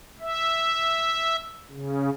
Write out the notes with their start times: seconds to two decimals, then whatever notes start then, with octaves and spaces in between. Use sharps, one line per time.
0.20 E5
1.71 C#3